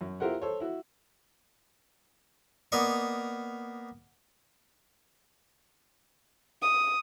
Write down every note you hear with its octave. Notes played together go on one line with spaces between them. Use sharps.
F#2
E4 F4 G4 A#4 C5 F#5
A4 C5 C#5
E4 F#4
A#3 B3 A#4 D5 D#5 C#6
D#6